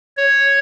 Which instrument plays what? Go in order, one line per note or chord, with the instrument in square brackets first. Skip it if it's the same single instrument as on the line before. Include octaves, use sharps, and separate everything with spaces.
[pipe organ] C#5